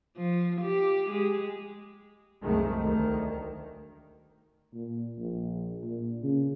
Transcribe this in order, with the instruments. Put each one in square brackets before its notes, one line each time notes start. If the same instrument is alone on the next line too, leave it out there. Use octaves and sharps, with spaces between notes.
[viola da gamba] F3
G4
G#3
[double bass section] C2 F#2 D#3 G#3 A3
D2 D#3
[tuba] A#2
A#1
A#2
C#3